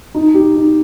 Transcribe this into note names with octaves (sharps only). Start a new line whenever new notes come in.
D#4
G4
D#4